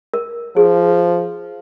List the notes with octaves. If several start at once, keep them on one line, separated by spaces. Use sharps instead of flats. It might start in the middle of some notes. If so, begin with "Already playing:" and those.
A#4
F3 G#4